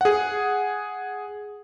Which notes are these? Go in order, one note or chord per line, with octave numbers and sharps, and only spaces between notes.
G#4 F#5